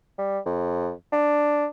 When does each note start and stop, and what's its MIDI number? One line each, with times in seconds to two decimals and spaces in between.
0.18 0.39 55
0.46 0.92 41
1.12 1.66 62